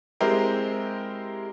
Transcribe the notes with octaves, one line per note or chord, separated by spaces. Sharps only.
G#3 C4 E4 G4 A#4